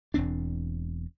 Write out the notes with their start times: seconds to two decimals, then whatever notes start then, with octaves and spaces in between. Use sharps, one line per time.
0.14 E1 E2 C4 D4